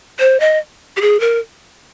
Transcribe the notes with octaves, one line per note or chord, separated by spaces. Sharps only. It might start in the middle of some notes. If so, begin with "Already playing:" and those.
C5
D#5
G4
G#4
A#4